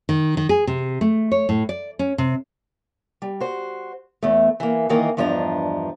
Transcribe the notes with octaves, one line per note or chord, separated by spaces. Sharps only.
D#3
D#3
G#4
C3
A3
C#5
A2
D5
C#4
C3
G3
F#4 C5
E2 A3
E3 A#3
D#3 E3 A#3 A#4 D#5
E2 G2 F3 D4 D#5 A#5